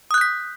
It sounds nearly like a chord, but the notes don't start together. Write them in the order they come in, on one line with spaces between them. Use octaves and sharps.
D#6 F#6 G6 B6